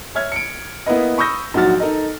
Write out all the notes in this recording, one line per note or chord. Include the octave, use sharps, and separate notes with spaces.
C#5 E5 F6 G#6
C#7 D7
A#3 B3 E4 B4 D#5
B5 C#6 D#6 E6 G6 A#6
A#1 G#2 F#3 F#4 F6 A6
D#4 A4 A#4 D#5